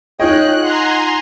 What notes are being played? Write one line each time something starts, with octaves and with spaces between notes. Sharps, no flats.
D#4 F4 G#4 C#5 D#5 G5 F#6
F#5 G#5 A#5 C6